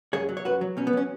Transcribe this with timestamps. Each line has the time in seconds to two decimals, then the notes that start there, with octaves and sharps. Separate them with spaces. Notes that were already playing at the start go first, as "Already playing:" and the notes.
0.13 F#2 G#4 C#5
0.29 F#3
0.37 C#5
0.45 F#2 F#4 B4
0.61 F#3
0.77 B2 C#4
0.87 B3
0.93 F#3 C#4